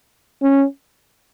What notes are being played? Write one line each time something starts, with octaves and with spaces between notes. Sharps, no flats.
C#4